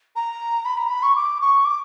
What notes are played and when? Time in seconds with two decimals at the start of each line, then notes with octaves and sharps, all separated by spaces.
0.15 A#5
0.65 B5
0.77 A#5
0.89 B5
1.02 C#6
1.15 D6
1.41 C#6
1.64 D6